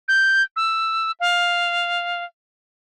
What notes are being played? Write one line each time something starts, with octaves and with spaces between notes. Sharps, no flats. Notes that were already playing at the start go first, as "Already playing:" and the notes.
G6
E6
F5